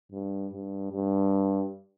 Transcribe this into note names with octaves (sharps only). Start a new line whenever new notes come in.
G2
G2
G2